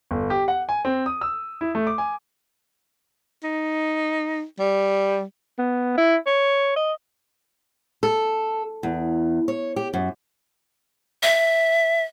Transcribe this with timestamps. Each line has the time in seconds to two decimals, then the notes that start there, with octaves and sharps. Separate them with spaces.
0.11 G1
0.30 G4
0.48 F#5
0.69 G#5
0.85 C4
1.06 D#6
1.21 E6
1.61 E4
1.75 A3
1.87 D6
1.98 G#5
3.44 D#4
4.59 G3
5.58 B3
5.97 E4
6.26 C#5
6.76 D#5
8.03 A4
8.83 E2
9.48 C#5
9.76 G4
9.94 F#2
11.23 E5